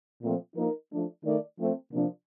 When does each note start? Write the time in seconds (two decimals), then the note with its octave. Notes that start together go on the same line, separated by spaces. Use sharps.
0.23 A#2 F3 A3 C4
0.56 F3 A#3 D#4 A#4
0.91 F3 A3 D4
1.24 D#3 A3 D#4 A#4 D5
1.58 F3 A3 C4
1.92 C3 F3 A#3 D4